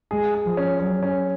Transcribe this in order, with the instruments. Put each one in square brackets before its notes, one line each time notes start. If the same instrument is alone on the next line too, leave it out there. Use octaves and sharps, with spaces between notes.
[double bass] G#3 [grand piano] G#4
[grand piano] G#4
[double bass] F3
[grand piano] C#4
[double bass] F#3 [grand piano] C#4
[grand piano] C#4